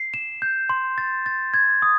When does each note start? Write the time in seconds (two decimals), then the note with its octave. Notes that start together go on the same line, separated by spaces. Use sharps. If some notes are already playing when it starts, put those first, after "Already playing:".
Already playing: C7
0.14 E7
0.42 G6
0.69 C6
0.98 A6
1.26 A6
1.54 G#6
1.82 D#6